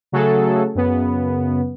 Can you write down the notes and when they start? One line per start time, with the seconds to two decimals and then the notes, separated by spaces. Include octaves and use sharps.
0.12 C#3 F#3 A3 F#4 G#4 A4
0.75 F#2 C#3 B3